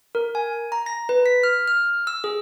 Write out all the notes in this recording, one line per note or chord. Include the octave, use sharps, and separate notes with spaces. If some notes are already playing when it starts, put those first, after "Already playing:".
A#4
G#5
A#5
A#6
B4
B6
F6
F6
E6
G#4